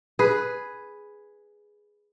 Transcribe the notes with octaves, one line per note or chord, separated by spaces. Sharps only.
G#4 B4